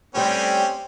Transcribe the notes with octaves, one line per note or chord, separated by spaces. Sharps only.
G3 A3 C4 C#4 G4